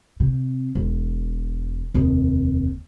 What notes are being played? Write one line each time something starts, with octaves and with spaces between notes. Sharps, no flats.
C3
E1
F1 D#2